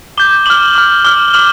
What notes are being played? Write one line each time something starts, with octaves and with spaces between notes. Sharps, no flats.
D6 G6 G7
D6 F6 F#7
D6 F6
D6 F6 G7
F#7
D6 F6 F#7